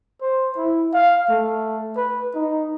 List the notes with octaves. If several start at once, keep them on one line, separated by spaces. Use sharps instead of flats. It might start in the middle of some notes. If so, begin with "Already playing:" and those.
C5
E4
F5
A3
B4
D#4